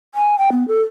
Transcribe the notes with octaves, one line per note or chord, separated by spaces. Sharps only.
G#5
G5
B3
A4